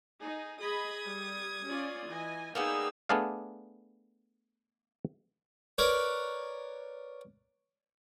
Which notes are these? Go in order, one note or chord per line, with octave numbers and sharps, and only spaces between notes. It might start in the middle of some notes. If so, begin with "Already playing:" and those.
D#4 G#4
G#4 D#5 B5 D#6 G#6
G3
C#4 F4 D5
E3 D#5 G#5
A#3 B3 D#4 G#4 D5 F5 G5 E6
A3 B3 D4 G#4 D5 F5
A#4 B4 C#5 D5